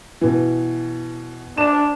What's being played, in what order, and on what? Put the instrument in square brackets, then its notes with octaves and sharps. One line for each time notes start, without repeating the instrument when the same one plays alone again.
[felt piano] B2 E3
[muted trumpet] D4 [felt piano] E7